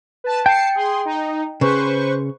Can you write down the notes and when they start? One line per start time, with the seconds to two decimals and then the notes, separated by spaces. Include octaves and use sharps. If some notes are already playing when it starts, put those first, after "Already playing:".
0.24 B4 A5
0.46 G5 A5 C7 C#7
0.75 G#4 C6
1.05 D#4
1.61 C#3 B4 C5 C#6